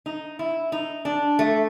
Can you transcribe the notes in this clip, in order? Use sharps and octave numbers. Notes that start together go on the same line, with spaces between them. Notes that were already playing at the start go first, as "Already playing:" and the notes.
D#4
E4
D#4
D4
A3